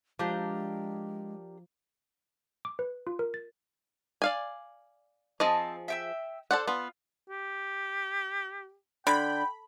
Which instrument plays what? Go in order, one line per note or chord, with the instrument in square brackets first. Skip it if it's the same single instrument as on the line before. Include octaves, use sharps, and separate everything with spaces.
[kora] F3 [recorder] G#3 [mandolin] D4 G4 A#4
[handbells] D6
B4
F4
A#4
A6
[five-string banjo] D5 F5 G#5
[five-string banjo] F3 G#4 D#5 [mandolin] C4 A5
[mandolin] E5 G5 E6
[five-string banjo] A4 D5 F#5 [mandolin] C5
[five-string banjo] B3 [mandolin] F4
[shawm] G4
[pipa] D3 [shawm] G5 [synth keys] B5